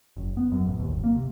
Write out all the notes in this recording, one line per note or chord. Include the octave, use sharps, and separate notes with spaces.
F#1
B3
F#2
A1
D#2
G1
A#3
C3